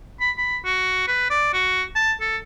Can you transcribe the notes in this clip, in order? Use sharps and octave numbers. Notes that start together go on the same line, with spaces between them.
B5
B5
F#4
B4
D5
F#4
A5
A4